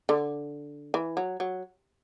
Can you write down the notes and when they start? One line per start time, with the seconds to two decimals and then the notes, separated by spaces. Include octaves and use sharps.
0.09 D3
0.94 E3
1.17 F#3
1.40 F#3